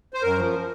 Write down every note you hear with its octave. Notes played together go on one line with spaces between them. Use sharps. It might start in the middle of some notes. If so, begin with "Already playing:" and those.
C5
F#2 A#4
F3